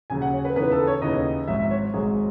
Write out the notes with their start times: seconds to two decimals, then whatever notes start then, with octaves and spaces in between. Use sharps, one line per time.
0.10 D#2 C#3 F#3 G#5
0.22 F#5
0.33 C#5
0.45 B4
0.56 D#2 C#3 E3 B3 D#4 B4
0.72 A4
0.87 C#5
1.02 D#2 C#3 E3 B3 D#4 D#5
1.48 G#1 G#2 F#3 E5
1.71 C#5
1.94 G#1 G#2 F#3 G#4